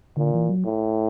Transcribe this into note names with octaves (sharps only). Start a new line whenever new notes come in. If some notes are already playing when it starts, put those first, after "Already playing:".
A#2 D3
E3
F#3
A2